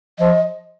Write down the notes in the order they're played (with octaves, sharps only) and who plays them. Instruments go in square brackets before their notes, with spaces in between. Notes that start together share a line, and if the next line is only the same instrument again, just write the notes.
[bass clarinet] F3 [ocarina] D#5